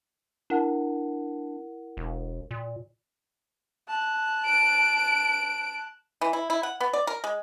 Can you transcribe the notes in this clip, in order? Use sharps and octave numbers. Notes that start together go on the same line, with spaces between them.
D4 E4 A#4 F#5
E1
A#2
A5 F#6
D7
E3
E4
E4
F#5
B3
D5
A#4
G#3